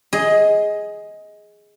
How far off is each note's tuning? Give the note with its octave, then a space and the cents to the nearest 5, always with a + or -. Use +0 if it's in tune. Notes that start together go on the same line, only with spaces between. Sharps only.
G#4 +0 D#5 +15